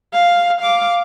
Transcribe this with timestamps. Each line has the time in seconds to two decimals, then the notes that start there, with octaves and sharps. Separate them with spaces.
0.13 F5
0.61 F5 D6